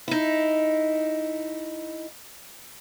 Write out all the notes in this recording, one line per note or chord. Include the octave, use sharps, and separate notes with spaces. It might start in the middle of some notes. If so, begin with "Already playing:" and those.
D#4 E4